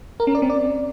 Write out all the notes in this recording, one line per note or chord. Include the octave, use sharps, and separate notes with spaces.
A#4
C#4
D5
C4
D5